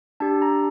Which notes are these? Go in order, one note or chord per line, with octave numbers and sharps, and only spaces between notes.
D4 G4 A5
A#5